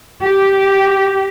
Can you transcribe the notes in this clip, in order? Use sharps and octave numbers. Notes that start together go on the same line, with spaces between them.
G4